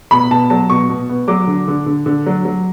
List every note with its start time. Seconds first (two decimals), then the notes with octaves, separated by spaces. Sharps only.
0.11 B2 B5
0.31 B2 A5
0.50 F#3 A5
0.70 B2 C#6
0.89 B2
1.09 B3
1.28 F#3 D6
1.47 D3
1.68 D3
1.86 D3
2.06 D3
2.26 F#3
2.45 F#3